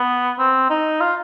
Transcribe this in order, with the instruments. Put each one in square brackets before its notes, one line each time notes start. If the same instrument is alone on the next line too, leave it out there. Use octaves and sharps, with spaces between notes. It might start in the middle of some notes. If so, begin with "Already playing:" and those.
Already playing: [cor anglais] B3
C4
D#4
F4